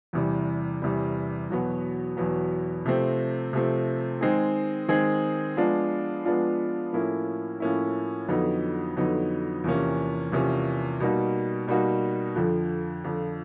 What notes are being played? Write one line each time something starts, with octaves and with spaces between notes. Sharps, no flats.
E2 C3 E3 G3
E2 C3 E3 G3
E2 B2 F#3 B3
E2 B2 F#3 B3
C3 F3 A3 C4
C3 F3 A3 C4
D#3 G#3 C4 D#4 G#4
D#3 G#3 C4 D#4 G#4
F3 G#3 B3 D4 F4
F3 G#3 B3 D4 F4
A2 F3 A#3 C#4 E4
A2 F3 A#3 C#4 E4
F2 D3 F#3 B3 D#4
F2 D3 F#3 B3 D#4
E2 C3 F3 A#3 C#4
E2 C3 F3 A#3 C#4
B2 G3 A#3 D#4 F#4
B2 G3 A#3 D#4 F#4
F2 D3 F3
F2 D3 F3